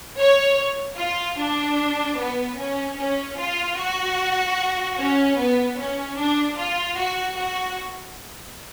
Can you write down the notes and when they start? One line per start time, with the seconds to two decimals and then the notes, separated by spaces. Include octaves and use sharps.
0.19 C#5
0.99 F4
1.39 D4
2.19 B3
2.59 C#4
2.98 C#4
3.38 F4
3.78 F#4
4.98 C#4
5.38 B3
5.78 C#4
6.18 D4
6.57 F4
6.97 F#4
7.37 F#4